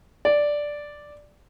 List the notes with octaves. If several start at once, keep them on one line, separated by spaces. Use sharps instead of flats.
D5